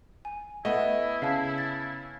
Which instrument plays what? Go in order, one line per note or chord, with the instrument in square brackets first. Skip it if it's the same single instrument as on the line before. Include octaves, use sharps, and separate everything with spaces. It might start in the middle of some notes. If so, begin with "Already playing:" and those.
[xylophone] G#5
[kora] A3 B3 [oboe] E4 [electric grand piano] D#5
[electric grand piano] C#3 [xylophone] F5 A5 B6
[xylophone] A6